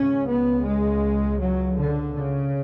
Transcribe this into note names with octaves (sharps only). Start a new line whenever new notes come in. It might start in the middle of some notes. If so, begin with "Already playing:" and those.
Already playing: C#2 C#3 C#4
B3
G#3
F#3
D3
C#3